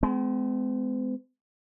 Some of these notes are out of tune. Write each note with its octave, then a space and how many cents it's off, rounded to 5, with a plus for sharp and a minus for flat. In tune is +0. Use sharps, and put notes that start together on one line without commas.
G#3 +25 C4 -45